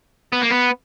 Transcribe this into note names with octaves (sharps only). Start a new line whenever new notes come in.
B3
A#3
B3